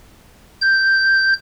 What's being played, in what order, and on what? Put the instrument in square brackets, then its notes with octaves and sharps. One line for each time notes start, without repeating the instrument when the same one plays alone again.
[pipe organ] G6